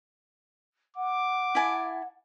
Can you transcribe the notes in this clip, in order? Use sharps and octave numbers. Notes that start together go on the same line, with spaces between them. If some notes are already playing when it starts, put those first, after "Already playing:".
F#5 D6
E4 G#5 A5